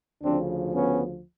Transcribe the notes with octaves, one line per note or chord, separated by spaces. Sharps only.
D2 C#3 F3 C4 D4
B3 C#4